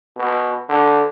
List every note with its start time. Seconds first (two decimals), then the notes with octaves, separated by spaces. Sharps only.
0.17 B2
0.69 D3